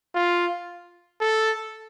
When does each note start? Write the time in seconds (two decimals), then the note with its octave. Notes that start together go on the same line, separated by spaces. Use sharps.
0.15 F4
1.21 A4